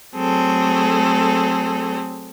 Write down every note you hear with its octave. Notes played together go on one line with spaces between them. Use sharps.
F#3 A3 C4 G#4 A4